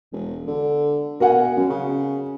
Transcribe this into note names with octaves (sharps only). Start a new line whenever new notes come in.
E1
D3
B2 A#4 F#5 G#5
F#2 C#4
C#3